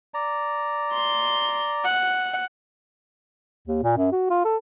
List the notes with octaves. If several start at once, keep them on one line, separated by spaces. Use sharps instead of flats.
D5 A#5
C6
F#5
D#2
A#2
F#2
F#4
F4
A4